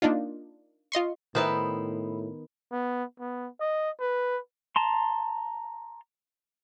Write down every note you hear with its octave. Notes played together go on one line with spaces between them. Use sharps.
A#3 D4 D#4 F4
F4 D#5 C6 C#6
A2 D#3 B3 D#4 E4 B4 C5
B3
B3
D#5
B4
A5 A#5 C6